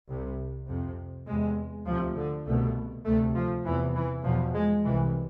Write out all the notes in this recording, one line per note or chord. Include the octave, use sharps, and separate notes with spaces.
C2 C3
F2 C3
E2 C3 G#3
D2 C3 F3
D3
C2 B2 A3
D2 C3 A3
F3
E2 C3 E3
E3
E2 B2 F3
G#3
C2 C3 E3